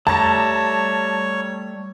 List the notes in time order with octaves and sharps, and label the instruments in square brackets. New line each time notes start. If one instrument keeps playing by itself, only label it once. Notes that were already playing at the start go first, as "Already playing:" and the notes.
[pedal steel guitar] G3 A3 [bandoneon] C#5 [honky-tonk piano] A5 A#5